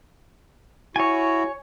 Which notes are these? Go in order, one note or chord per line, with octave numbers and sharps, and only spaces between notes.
E4 F#4 C#5 G#5